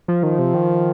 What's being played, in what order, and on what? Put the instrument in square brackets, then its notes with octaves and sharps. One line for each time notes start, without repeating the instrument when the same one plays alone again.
[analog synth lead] F3
[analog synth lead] D#3 [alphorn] F3
[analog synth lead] C3
D#3